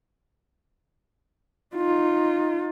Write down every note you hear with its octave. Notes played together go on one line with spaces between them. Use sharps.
D#4 F4